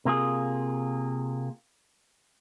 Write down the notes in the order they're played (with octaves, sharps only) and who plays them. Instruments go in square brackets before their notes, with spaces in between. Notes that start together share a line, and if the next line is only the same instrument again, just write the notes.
[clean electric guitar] C3 A#3 F4 G#4